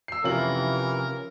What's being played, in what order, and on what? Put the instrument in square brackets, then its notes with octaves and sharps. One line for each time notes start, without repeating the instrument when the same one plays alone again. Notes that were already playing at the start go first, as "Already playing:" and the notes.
[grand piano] E6 C7
[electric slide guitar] C3 F3 G4 [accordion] E3 [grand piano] C#4 F4 F#7 [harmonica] A#4